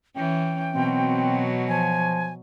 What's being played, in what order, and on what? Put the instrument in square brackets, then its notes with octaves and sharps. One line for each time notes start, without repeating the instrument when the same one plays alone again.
[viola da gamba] E3 C#4 [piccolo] G5
[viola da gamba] B2 F#3 [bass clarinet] C4
[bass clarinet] F3 [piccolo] G#5